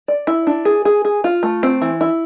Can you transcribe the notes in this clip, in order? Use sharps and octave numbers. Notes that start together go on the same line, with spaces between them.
D5
E4
D4
G#4
G#4
G#4
F4
A3
C4
E3
E4